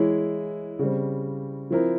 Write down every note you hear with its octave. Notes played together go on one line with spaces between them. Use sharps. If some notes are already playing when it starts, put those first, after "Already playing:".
Already playing: E3 G#3 E4 G#4 C#5
C#3 G3 C4
F3 C4 E4 A#4